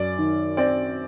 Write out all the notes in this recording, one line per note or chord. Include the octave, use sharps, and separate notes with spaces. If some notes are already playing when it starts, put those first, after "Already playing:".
Already playing: F#2 D5
D#3
C4 D5